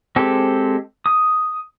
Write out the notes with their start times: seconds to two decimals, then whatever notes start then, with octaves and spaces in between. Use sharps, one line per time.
0.16 G#3 C4 G4 A4
1.06 D#6